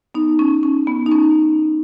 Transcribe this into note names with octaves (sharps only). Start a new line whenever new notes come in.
B3 D#4
C#4
C#4
B3
D#4
C#4